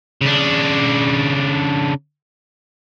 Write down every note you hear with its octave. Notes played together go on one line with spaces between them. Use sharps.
C#3 D4